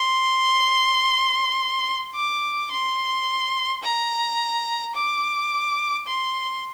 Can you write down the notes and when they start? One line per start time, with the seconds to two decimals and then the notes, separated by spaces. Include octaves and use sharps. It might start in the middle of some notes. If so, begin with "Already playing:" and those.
Already playing: C6
2.15 D6
2.71 C6
3.84 A#5
4.95 D6
6.07 C6